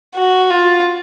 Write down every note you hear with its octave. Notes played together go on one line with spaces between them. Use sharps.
F#4
F4